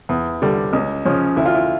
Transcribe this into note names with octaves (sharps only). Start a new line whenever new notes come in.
E2
D3 G3
C#2
C#3 F3 C#4
D2 E4
F4
E4